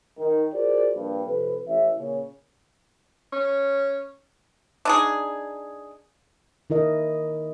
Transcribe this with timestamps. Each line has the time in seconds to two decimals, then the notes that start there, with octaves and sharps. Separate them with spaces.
0.17 D#3
0.53 F4 F#4 G#4 A#4 C5 D5
0.94 A#1 G2
1.25 F2 C3 A4 B4
1.67 A1 E5
1.97 A#2 C#3 C#5
3.32 C#4
4.85 D4 D#4 G#4
6.70 D#3 E4 A#4 D#5